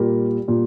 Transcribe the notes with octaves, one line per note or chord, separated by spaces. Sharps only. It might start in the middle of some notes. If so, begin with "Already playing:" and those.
Already playing: A#2 G3 A#4
A#2 G3